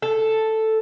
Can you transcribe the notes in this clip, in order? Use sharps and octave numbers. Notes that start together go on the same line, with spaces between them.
A4